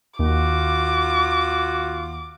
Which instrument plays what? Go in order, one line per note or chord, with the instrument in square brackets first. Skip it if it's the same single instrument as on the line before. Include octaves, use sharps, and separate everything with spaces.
[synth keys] D#2 [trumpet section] F4 F#4 [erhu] D6